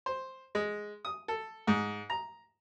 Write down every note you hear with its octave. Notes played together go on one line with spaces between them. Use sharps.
C5
G#3
D#6
A4
G#2
A#5